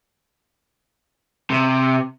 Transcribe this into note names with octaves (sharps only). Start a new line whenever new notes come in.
C3